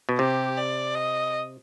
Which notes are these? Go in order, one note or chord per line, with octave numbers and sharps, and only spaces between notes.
B2
C3 G4
D5
D#5